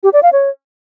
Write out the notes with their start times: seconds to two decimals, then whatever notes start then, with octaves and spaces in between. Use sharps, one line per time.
0.03 G4
0.13 D5
0.23 F5
0.33 C#5